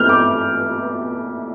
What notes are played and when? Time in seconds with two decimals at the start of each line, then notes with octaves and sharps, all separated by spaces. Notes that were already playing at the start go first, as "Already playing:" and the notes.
Already playing: E3 A3 C4 E4 F6 G6
0.09 D6